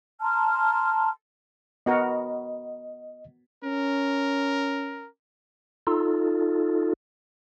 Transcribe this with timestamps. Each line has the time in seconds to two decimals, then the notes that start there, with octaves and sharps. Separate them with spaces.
0.21 A5 A#5 C6 F6
1.86 B3 F#4 A#4 D#5
3.64 C#4 A#4
5.87 D#4 F4 A4